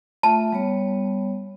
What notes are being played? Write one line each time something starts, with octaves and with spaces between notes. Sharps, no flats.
A3 F4 E5 A5
G3 B3 C#5